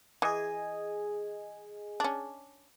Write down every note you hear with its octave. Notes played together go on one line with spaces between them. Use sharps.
E3 G#4 D#5 G#5
C#4 D4